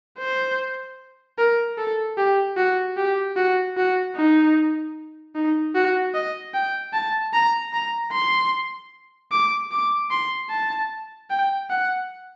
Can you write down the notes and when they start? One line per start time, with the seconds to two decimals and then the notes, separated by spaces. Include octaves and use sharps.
0.19 C5
1.38 A#4
1.78 A4
2.17 G4
2.57 F#4
2.97 G4
3.37 F#4
3.77 F#4
4.16 D#4
5.35 D#4
5.75 F#4
6.14 D#5
6.54 G5
6.94 A5
7.33 A#5
7.73 A#5
8.12 C6
9.32 D6
9.71 D6
10.11 C6
10.50 A5
11.30 G5
11.70 F#5